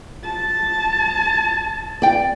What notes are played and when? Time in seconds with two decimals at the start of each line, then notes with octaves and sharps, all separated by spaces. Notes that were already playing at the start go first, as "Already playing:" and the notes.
0.24 A5
2.02 D5 G5